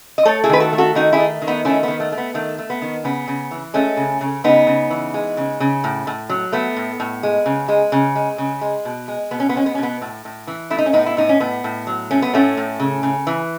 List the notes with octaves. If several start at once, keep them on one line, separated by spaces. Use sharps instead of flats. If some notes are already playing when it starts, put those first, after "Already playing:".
D#5
A3 A4 C#5
E4 G#4
D#3 B4
F#4 A4
A3
F#4 A4
D#3 D#4 F#4
E4 G#4
A3
D#3
B3 D#4
A3 C#4 E4
D#3 B3
A3
A3
B3
D#3 A3
A3
B3
D#3
C#3 B3
C#3
E3
G#3 A3 C#4
C#3
C#3
C#3 B3 D#4
C#3
E3
G#3
C#3
C#3
A2
A2
F#3
A3 B3
A2
A2
G#3
C#3
G#3
C#3
G#3
C#3
G#3
B2
G#3
B2 B3
C#4
B3
G#3 C#4
B3
C#4
B2 B3
A2
A2
E3
A3 E4
D#4
C#4
A2 B3 D#4
E4
A2 D#4
C#4
A2 B3
A2
F#3
A3 C#4
B3
A2 A3 C#4
A2
C#3
C#3
E3